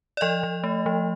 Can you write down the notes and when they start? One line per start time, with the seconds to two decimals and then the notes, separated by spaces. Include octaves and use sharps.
0.17 D5
0.21 F3 D#5
0.43 F3
0.64 A3
0.86 F3